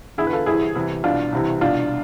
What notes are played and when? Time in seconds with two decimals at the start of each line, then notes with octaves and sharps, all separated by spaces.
0.18 E2 D3 E4 G#4
0.27 B4
0.33 F4 A4
0.46 C2 C3 E3 E4 G#4
0.75 C2 C3 E3
1.04 C2 B2 D4 F4
1.33 C2 C3 E3
1.61 C2 B2 D4 F4